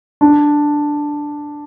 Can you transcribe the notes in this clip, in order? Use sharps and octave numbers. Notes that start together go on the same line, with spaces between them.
D4